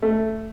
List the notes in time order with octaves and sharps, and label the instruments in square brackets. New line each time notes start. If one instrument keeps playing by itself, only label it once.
[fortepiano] A3